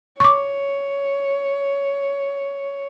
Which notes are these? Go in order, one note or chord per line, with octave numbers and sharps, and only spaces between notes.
C#5 C#6 D6